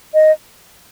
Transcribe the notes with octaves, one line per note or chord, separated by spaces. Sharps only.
D#5